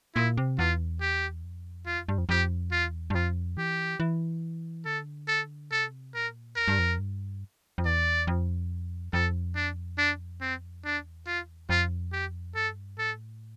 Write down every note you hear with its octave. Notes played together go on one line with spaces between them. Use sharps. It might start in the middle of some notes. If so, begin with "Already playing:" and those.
A#2 E4
C3
E2 F4
G4
F2
E2 F4
F2
G2
F2
F2 G4
E2 F4
G2
F2 F4
E3 G4
E3
D3 A4
A4
C3 A4
A#2 A#4
F2 A#4
G2
F2
G2
F2
E2 D5
F2
F2 A4
D4
D4
C4
E2 D4
F4
F2 F4
G4
G2 A4
A2 A4